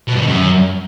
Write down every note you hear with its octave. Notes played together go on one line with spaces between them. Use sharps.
B2
G2
D#3
F#2